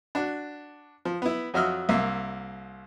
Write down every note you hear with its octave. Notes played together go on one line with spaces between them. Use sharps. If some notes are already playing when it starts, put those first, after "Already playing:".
D4 F#4
F3
B3 E4
F2 F#3 F#4 D#5 E5 F6
C2 A#3 E5